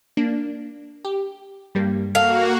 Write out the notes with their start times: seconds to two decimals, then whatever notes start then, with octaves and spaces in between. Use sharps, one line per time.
0.17 A#3 D4
1.05 G4
1.75 G2 G3 A#3
2.15 A#3 F#4 A4 F5